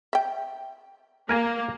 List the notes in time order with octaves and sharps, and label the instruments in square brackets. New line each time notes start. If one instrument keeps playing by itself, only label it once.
[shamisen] E5 G5
[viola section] A#3 [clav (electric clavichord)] A#4 G#5 A#5